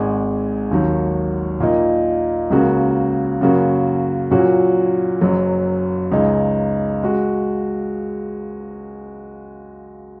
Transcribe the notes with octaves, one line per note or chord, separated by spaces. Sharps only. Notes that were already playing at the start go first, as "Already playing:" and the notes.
Already playing: G#1 G#2 G#3
D#2 D#3 F#3
A#2 A#3 D#4
C#2 C#3 A#3 F#4
F#2 C#3 A#3 F#4
A#2 F#3 C#4 F#4
F#1 F#2 F#3
C#2 C#3 G#3 D#4
G#3 F#4